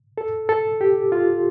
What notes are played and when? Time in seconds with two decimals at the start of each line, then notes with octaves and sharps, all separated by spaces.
0.18 A4
0.49 A4
0.81 G4
1.12 F4